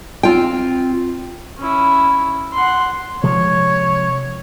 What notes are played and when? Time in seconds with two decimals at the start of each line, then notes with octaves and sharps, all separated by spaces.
0.23 C4 F4 G5
1.59 C#4 E4
2.53 F#5 C6
3.23 C3 F3 G#3 C#5